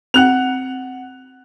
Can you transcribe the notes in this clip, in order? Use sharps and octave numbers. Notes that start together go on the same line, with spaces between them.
C4 F#5 G5 F#6 F7